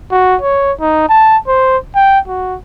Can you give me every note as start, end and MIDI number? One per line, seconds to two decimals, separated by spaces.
0.11 0.36 66
0.42 0.72 73
0.81 1.08 63
1.09 1.38 81
1.48 1.77 72
1.96 2.20 79
2.28 2.55 66